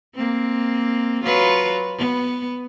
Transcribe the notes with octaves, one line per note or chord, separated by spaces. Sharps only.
A#3 C4
F#3 F4 B4
B3